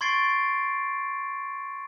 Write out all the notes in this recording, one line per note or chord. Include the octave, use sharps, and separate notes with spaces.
C6 C#6 G#6 A6 C7 D7